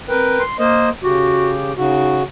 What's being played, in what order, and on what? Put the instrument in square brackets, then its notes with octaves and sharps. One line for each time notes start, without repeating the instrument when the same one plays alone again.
[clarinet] C4 [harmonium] A#4 B4 G5
[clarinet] C6
[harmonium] A#3 C5 D#5 [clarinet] A#4
[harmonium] C#3 G4 [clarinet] F#4
[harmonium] C#3 F#4 [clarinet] D#4